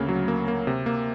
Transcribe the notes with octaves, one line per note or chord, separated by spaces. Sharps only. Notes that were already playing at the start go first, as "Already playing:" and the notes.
Already playing: D2 C#3 A#3
F#3
A#3
A#3
C3
A#3